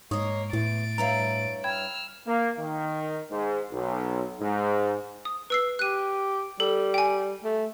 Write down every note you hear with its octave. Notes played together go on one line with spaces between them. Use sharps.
G#2 A#3 C#5 D#5 C#6 D#6
E2 A2 A6 D7
G2 E4 C#5 F5 A#5
G5 B5 E6 F6 G#6
A#3
D#3
G#2
B1
G#2
D#6
B4 E6 C7
G4 F#6 D#7
G3 A4
G5 G#5
A3